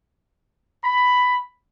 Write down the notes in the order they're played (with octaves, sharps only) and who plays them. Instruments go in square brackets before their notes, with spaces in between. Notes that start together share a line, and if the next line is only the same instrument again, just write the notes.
[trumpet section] B5